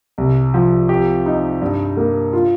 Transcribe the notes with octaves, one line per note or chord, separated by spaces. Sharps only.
C2
F3
G4
D#4
G2
A#3
F4